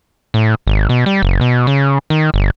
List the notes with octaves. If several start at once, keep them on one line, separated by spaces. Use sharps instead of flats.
A2
G#1
B2
G3
F#1
B2
C#3
D#3
G1